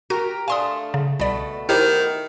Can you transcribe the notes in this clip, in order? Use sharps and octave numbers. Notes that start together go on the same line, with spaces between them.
F#4 G4 A#4
A3 D4 F5 G#5 C6 D#6
C#3
C2 B2 A3 D5
D#3 E4 G4 C5